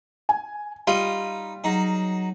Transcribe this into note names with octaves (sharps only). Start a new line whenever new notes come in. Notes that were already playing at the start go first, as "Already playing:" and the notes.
G#5
G3 D#4 F4 B5 D#6
F#3 D#4 G#4